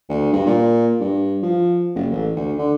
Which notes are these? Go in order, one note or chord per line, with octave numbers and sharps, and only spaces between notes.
D2
G2
A#2
G2
F3
F#1
A1
D2
D3